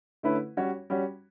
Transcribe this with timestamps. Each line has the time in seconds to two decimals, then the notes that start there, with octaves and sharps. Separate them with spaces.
0.23 D3 A3 C#4 E4 B4
0.57 G3 C#4 F#4 C#5
0.90 G3 C#4 F#4